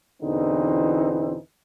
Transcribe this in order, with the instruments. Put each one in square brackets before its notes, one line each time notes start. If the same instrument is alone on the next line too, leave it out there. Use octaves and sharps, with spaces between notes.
[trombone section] E2 B2 D3 E3 C4 D#4